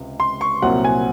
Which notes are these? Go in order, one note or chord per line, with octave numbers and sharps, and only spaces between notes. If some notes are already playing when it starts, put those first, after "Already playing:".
Already playing: C#2 C3
C6
C#6
C2 A#2 F#3 C4 F#5
G#5